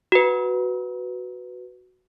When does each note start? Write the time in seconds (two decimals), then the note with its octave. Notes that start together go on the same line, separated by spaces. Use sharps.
0.12 F#4 B4